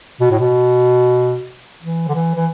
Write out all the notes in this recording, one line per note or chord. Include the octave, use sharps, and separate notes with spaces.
B2
A2
B2
E3
D3
E3
E3